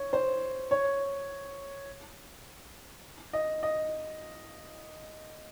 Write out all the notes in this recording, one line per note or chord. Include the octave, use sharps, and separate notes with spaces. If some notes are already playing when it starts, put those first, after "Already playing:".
Already playing: C#5
C5
C#5
D#5
D#5